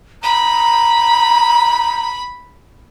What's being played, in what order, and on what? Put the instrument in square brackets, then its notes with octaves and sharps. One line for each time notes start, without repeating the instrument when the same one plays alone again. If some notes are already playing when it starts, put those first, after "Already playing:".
[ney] A#5 [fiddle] B5